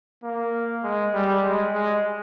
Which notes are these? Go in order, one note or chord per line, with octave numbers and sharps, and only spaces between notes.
A#3
G#3
G3
G#3
G#3